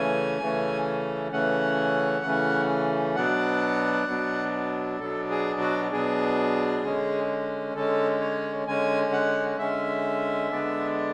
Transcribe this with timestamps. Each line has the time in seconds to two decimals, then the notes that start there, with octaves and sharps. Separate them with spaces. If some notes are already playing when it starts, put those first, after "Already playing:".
Already playing: C#3 E3 A3 C#4 G#5
0.40 C#3 E3 A3 C#4
1.32 C#3 E3 A3 C#4 F#5
2.23 C#3 E3 A3 C#4
3.16 B2 F#3 B3 D4 F#5
4.08 B2 F#3 B3 D4
4.99 B2 F#3 B3 D4 A4
5.30 G#4
5.60 F#4
5.92 B2 F#3 B3 D4 G#4
6.83 D3 G#3 C#4
7.75 D3 G#3 C#4 A4
8.20 C#5
8.67 D3 G#3 C#4 G#5
9.12 F#5
9.59 D3 G#3 C#4 E5
10.51 D3 G#3 B3 D4